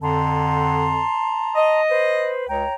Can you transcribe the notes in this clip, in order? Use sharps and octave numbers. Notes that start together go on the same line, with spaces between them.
F2 D3 A5 A#5 C6
D#5
B4 C5
C#2 C#5 G5 A#5